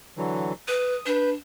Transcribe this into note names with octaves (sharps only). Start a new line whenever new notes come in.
D3 E3 F#3
B4 D#6
D4 B4 G6